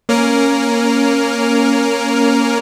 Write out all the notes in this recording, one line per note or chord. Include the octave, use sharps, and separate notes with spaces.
A#3 C#4 A#4